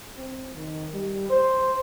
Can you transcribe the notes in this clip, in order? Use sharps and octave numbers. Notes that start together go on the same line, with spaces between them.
C4
D#3
G3
C5